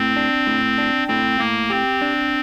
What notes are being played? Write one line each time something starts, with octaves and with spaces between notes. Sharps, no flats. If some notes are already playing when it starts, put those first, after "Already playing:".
Already playing: A2 C4
D4
A2
D4
A2 C4
A2 A#3
C4 G4
D4